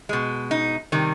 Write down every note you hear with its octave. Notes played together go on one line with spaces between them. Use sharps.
B2 G#3
D#4
C3 D#3 G3